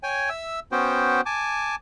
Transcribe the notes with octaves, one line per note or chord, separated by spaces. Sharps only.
C#5 G5 G#5
E5 E6
B3 C#4 F#4 C5 G5
G#5 A5 D6